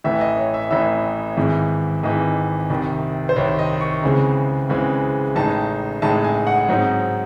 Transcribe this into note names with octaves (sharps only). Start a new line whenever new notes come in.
A1 A2 E3 E5
D#5
C#5
E5
A1 A2 E3 E5
G#1 G#2 E3
G#1 G#2 E3 D#5
C2 C3 D#3
C5
C2 C3 D#3 C#5
D#5
C#6
C#2 C#3 E3 G#3 C4
C#2 C#3 E3 G#3 C4
A1 A2 G#3 D#4 A5
A1 A2 G#3 D#4 A5
G#5
F#5
G#2 F#3 C4 D#4